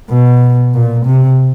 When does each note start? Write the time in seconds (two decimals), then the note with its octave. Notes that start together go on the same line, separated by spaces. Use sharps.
0.10 B2
0.74 A#2
1.06 C3